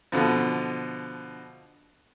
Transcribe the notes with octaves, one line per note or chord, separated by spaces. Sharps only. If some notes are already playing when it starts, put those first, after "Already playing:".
B2 D3 F3